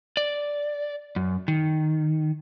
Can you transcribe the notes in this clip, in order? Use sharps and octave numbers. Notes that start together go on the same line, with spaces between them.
D5
F#2
D#3